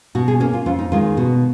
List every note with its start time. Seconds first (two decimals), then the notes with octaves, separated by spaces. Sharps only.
0.15 B2 F#4
0.28 G#4
0.40 A#3 C#4 F#4
0.53 F4
0.66 F2 F4
0.79 D#4
0.92 D#3 G#3 C#4 F4
1.17 B2 F#4